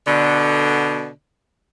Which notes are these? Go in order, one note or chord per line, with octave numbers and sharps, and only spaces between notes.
B2 D3